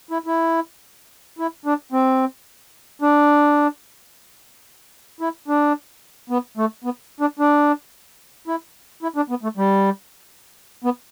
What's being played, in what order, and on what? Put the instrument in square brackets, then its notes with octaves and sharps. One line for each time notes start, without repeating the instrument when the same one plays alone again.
[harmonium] E4
E4
E4
D4
C4
D4
E4
D4
B3
A3
B3
D4
D4
E4
E4
D4
B3
A3
G3
B3